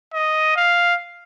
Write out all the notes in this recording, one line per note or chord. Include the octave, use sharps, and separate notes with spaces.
D#5
F5